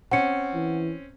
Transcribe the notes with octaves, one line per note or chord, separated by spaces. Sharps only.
C4 C#4 F#5 C#7
E3